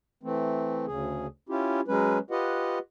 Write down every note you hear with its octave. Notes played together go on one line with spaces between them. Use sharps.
E3 A3 C4
D2 C#3 G#4
C#4 E4 F4 G4
F#3 G#3 C#4 B4
F4 G4 B4 D#5 F#5